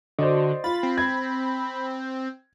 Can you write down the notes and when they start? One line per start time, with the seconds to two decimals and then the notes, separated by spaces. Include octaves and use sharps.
0.19 D3 F#4 C5 D5 D#5
0.64 F4 B5 A6
0.83 C4
0.98 G#6